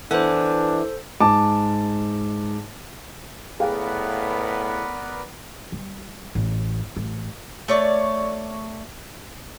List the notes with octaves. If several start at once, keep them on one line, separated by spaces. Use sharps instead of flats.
E2 E3 D4 A4 C5 F#5
G#2 A5 D6
A2 B3 G#4 A#4 B4 D5 F5 G5
G3
A1
A1
A3 C#5 D5